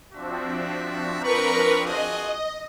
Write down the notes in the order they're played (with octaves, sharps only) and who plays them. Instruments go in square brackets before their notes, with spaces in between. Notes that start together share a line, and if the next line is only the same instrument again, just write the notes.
[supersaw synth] F3 C4 D4 [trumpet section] F#4 E5
[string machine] A#4 B4 [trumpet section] A#5 B5 C#6
[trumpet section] F4 F#4 G#4 [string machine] D#5